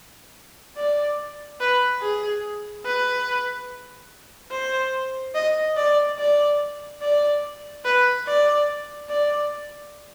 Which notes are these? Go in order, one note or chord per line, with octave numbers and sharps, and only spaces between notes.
D5
B4
G#4
B4
C5
D#5
D5
D5
D5
B4
D5
D5